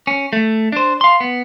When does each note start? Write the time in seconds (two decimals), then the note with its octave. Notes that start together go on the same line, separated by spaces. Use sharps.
0.07 C#4
0.33 A3
0.72 D4 C5
1.01 F5 C6
1.20 B3